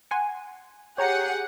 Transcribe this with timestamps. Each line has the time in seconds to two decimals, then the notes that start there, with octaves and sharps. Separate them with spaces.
0.11 F#5 G#5 C6
0.98 G4 G#4 C#5 F#5 G5 A#5 C#7